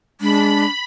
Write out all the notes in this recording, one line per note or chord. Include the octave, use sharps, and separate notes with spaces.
G#3 D4 B5